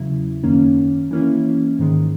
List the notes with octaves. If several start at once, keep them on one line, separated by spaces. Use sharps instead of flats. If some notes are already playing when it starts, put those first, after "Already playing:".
Already playing: E2 C#3 F#3 E4
F#2 D#3 A#3 C#4
E3 A#3 C#4 E4
G#2 D#3 G#3